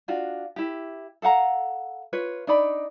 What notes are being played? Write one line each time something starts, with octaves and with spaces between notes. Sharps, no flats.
D4 F4 F#4
E4 G4
A4 F5 F#5 A#5
F4 B4 C#5
D4 D#4 D5 B5